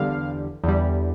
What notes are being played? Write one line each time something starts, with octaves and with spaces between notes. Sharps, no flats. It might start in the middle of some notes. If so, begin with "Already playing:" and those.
Already playing: E2 D3 G3 F5
E2 D3 G3